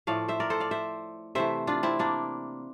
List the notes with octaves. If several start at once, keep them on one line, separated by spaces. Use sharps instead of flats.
A2 F3 A3 D5 F5
C5 E5
A#4 D5
A4 C5
D5 F5
C5 E5
C3 E3 A3 C5 E5
D4 F4
C4 E4
A#3 D4